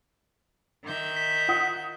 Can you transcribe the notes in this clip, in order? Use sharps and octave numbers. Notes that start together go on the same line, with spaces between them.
D#3 E5 G6
B6
F4 F#5 D#6